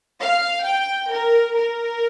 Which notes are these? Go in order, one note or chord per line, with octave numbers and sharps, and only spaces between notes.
F5
G5
A#4
A#4